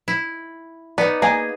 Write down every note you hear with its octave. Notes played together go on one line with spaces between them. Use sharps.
E4
B3 D#4 D5
A#3 G#4 G#5